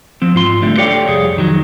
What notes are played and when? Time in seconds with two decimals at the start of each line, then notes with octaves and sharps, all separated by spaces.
0.22 F3 C4
0.35 G#2 F4 C6
0.62 D3 G3 A3
0.77 G4 A4 C#5 D5 F5 G5
1.07 C2 F2 G#4
1.36 F2 D#3 F#3